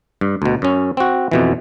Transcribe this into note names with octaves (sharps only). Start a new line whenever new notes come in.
G2
D2 B2
F#2 C#4
C4 F#4
F2 B2 E3